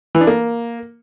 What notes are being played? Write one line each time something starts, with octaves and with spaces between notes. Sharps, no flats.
E3
D4
A#3